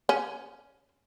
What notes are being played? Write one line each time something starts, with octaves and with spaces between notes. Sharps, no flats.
C#4